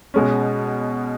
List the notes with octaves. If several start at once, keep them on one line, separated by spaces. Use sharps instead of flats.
B2 G#3 C#4